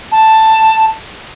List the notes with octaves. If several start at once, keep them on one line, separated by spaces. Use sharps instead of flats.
A5